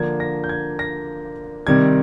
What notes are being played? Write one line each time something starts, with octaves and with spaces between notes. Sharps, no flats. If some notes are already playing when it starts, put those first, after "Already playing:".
Already playing: D3 F3 A#3 D4 G#6
A#6
G6
G#6
A#6
C3 D#3 G3 C4 G#6